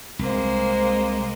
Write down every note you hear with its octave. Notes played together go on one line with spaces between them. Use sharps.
C2 G#3 A#3 C5